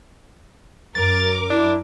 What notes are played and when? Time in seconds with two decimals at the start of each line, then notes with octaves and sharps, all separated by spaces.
0.95 F#2 A#4 D6 A6
1.50 D4 E4